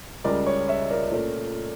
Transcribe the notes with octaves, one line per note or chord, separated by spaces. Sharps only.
C#2 C#3 G3 A#4 D5
C#5
C#5 E5
A#4 D5
A#2 A3 C#4